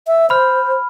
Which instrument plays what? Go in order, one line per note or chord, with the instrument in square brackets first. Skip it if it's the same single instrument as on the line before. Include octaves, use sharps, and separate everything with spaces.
[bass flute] E5
[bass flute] C5 [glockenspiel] B5 F6